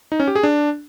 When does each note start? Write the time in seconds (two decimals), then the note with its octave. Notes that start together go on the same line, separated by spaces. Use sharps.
0.12 D#4
0.20 C#4
0.28 G4
0.35 G#4
0.43 D4